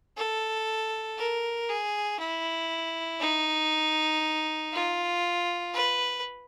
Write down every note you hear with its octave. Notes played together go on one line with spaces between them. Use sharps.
A4
A#4
G#4
E4
D#4
F4
B4